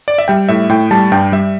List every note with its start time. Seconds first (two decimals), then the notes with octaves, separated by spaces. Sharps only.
0.08 D5
0.18 E5
0.28 G3 G5
0.49 A2 E5
0.69 A2 G5
0.91 G3 A5
1.12 G2 G5
1.32 G3 E5